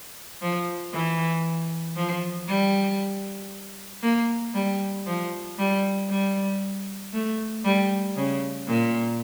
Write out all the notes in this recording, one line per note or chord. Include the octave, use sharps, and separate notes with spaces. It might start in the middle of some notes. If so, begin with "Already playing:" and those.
F3
E3
F3
G3
A#3
G3
F3
G3
G3
A3
G3
C#3
A#2